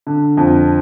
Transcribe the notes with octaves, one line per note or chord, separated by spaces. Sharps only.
D3
F2